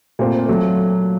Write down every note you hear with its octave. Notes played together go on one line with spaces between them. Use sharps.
A#2 A3 C4
F#3 A3